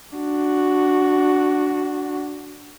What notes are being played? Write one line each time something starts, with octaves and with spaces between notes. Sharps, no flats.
D4 F#4